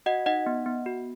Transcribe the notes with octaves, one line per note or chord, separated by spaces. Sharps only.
F#4 D#5 F#5
D#4 D#5 F#5
B3
B3
F#4